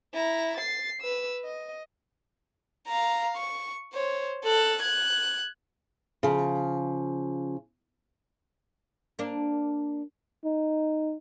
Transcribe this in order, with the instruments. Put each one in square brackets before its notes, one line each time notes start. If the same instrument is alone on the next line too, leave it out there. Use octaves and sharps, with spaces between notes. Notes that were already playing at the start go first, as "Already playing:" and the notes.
[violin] E4 A#5
A6 C7
B4 E6
D#5
F5 A#5
C#6
C5 C#5
A4 F#6
F#6 G#6
[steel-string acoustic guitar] C#3 F3
[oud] A#3 D4
[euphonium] D#4